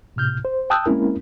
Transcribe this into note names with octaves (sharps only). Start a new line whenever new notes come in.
A2 C3 F6 G6
C5
G5 A5 D#6 E6 F#6 G6
G#3 A#3 C4 C#4 E4 A#4